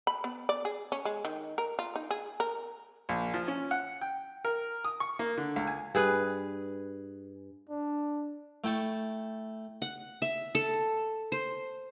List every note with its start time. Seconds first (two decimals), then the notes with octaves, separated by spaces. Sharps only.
0.07 B5
0.24 B3
0.49 D5
0.65 G#4
0.92 C#4
1.05 G#3
1.25 D#3
1.58 A#4
1.79 F4
1.96 D#4
2.11 G#4
2.40 A#4
3.09 A#1
3.34 F3
3.48 C#4
3.71 F#5
4.01 G5
4.45 A#4
4.85 D#6
5.00 C#6
5.19 A#3
5.37 D3
5.56 C#2
5.67 G#5
5.95 G2 G#4 B4
7.69 D4
8.64 A3 E4 G5 A5 C#6
9.82 F#5
10.22 E5
10.55 A4
11.32 C5